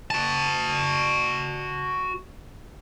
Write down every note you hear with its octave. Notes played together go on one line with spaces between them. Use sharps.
F#4 A5